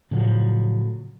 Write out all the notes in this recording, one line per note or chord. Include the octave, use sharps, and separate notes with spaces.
A2 C#3 F3 F#3